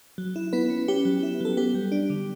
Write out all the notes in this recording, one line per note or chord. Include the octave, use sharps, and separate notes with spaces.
F#3
E4
B3 E4 B4
C#4
C#4 G4
F#3
E4
F#3 A4
B3 G4
G3
D4
D3